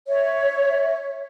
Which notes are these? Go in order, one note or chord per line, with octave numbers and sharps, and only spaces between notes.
C#5 E5